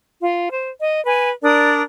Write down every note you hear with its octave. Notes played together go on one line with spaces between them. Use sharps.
F4
C5
D#5
B4 G#5
D4 A#4 D5 D#6